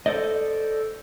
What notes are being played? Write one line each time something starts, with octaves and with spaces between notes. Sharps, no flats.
A4 C5 D5 D#5